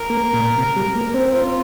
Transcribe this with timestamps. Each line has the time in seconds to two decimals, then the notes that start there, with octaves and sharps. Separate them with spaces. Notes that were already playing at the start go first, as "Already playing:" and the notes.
Already playing: A#4
0.10 A#3
0.33 A#2
0.58 C3
0.76 G3
0.95 A#3
1.14 C4
1.32 F4